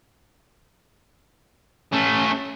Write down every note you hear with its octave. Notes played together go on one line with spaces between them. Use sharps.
A3 C#4